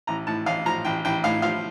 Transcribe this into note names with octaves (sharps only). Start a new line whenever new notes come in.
A1 A#5
A2 A5
A1 F5
F3 A#5
A1 G5
A1 G5
A2 F5
F3 F5